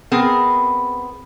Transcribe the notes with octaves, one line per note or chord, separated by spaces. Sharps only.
B3 C4 G#4 A#4